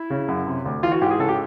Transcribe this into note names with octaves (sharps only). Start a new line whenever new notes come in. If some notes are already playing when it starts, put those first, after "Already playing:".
Already playing: E4
C#3
F#2
C3
D2
E3 F4
F#4
G#2 G4
G#4
C#3 A4
G4